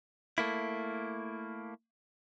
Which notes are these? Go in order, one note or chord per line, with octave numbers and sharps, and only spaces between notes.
A3 A#3 E4